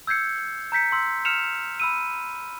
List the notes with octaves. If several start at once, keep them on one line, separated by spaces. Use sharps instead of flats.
E6 G6 G#6 C7 C#7
A#5 G6 B6 C#7
C6 E6
F6 C#7 E7 F7
B5 E6 D#7